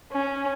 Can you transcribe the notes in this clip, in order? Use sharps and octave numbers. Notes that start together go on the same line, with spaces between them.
C#4